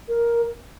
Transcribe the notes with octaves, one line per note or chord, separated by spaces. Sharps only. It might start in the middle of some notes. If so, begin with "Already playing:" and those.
A#4